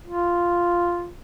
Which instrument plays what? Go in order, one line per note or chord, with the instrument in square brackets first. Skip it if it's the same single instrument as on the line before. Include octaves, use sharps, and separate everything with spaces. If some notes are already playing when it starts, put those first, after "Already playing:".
[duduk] F4